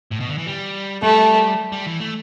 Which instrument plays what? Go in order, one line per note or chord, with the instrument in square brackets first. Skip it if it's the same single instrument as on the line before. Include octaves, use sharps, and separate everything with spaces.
[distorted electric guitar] A2
B2
D3
E3
G3
[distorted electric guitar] G3 [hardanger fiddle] A3
[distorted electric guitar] G3
E3
A3